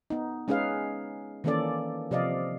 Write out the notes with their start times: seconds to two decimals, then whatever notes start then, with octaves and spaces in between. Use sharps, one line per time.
0.10 B3 D#4
0.48 G#3 C#4 D#4 G#4 B4 F5
1.44 D#3 E3 A#3 C#4 A4 D5
2.11 C3 F3 D5 D#5 F5